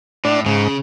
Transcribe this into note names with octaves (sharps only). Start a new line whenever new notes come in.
A2 D4
G#2 C#3